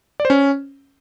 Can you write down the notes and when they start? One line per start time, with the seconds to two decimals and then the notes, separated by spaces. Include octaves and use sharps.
0.20 D5
0.25 C5
0.30 C#4